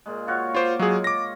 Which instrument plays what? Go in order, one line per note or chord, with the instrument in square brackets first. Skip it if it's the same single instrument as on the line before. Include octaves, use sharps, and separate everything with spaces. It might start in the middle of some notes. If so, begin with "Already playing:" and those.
[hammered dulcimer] A#2 G#3
F4 F#4 C#5
[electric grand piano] F4 C5 [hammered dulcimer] C#5 D6
[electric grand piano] F#3 G#4 [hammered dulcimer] G#3 F4
[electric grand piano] D6 A#6